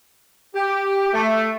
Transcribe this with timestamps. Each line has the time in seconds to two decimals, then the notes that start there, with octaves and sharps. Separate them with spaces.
0.54 G4
1.13 A3